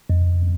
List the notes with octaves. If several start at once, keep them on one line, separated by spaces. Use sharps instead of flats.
F2